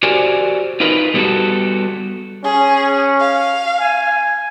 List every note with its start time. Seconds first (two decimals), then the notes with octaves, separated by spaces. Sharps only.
0.03 F#4 G4 A#4 C5 D5 G#5
0.80 D#4 F4 A#4 B4
1.14 G3 B3 C#4 D4 F#4 A4
2.44 C#4 G#4
3.21 F5
3.80 G#5